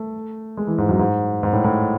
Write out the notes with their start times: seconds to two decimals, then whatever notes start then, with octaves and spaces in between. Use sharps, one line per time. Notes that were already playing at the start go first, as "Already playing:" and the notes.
Already playing: A3
0.57 G#3
0.67 E3
0.78 G#2
0.89 F#2
0.99 G#2
1.43 G#2
1.53 A2
1.64 A2